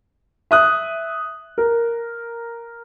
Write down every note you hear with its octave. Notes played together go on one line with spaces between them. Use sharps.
E5 D#6 F#6
A#4